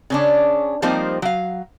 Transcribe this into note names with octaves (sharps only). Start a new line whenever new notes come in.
C#3 C#4 D4
F3 G3 A#3 C4 D#4 C5
F#3 F5